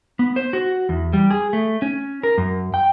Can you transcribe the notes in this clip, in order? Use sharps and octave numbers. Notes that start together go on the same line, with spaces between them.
B3
C5
F#4
E2
G3
G#4
A3
C#4
A#4
F#2
G5